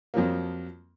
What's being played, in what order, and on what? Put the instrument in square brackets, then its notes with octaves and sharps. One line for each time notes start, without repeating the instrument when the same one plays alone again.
[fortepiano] F2 F3 F#3 A#3